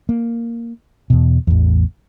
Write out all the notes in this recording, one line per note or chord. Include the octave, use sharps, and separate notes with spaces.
A#3
E2 B2
A1 E2